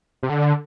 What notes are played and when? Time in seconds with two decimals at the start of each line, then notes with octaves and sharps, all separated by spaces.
0.23 C3
0.29 D3